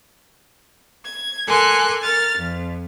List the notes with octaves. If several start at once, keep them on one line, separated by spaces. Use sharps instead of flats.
G#6
A4 A#4 G#5 C6 D6 F#6
A#4 F6 A6
F2